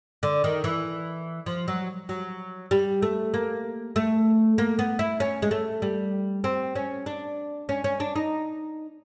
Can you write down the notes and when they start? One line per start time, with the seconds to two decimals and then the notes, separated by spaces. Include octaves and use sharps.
0.23 D3
0.44 D#3
0.64 E3
1.46 F3
1.68 F#3
2.09 F#3
2.71 G3
3.02 A3
3.34 A#3
3.96 A3
4.58 A#3
4.79 B3
4.99 E4
5.20 C#4
5.42 G#3
5.51 A3
5.82 G3
6.44 C4
6.75 C#4
7.06 D4
7.69 C#4
7.84 C#4
8.00 D4
8.16 D#4